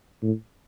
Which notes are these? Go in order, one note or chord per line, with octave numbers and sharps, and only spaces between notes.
A2